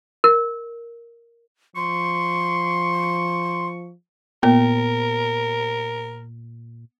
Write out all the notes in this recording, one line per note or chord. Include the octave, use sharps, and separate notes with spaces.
A#4
F3 C6 C#6
A#2 B3 A#4